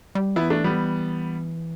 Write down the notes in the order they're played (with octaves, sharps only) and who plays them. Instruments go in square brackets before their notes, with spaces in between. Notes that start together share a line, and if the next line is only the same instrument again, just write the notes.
[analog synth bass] G3
[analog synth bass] E3 [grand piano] B3 E4
[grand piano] A3 D4
G3 B3